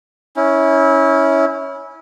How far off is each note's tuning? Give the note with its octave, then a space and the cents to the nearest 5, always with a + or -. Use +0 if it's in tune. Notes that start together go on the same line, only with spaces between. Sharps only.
C#4 +0 E4 -25